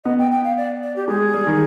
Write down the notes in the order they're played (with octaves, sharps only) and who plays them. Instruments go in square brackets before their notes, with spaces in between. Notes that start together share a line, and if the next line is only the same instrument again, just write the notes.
[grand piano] B3 [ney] D#5
[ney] G5
G5
F5
D5
D5
G4
[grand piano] G#3 [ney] G#4
[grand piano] G3
D#3